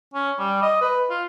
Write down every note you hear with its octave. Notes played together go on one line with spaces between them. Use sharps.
C#4
G3
D#5
B4
F4